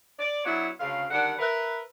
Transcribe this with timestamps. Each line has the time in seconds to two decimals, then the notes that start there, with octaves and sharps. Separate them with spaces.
0.19 D5
0.45 F#3 B3 D4 E4 F#4 C#5
0.80 D2 C#3 F5
1.11 D3 D#3 G3 D4 F#5
1.39 A#4 B4 E5